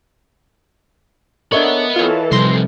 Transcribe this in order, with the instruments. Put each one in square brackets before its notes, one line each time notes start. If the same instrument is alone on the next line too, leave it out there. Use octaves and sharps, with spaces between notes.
[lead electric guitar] B3 B5 [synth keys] D4 A4 C#5 [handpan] A#4 D#5 E5
[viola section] E3 A4 [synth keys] F4 C#5
[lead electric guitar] A2 F3 [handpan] C3 G3 D#4 [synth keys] C6 A#6 C7